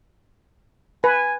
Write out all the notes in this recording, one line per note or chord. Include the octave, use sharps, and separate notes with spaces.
B4 G#5